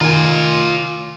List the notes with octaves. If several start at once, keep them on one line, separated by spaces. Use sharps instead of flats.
D#3 F4 G#5